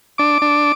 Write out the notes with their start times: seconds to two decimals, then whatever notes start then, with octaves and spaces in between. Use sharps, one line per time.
0.18 D4 D6
0.42 D4